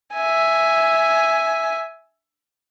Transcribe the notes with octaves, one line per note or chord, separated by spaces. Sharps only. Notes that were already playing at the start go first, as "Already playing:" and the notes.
E5 G#5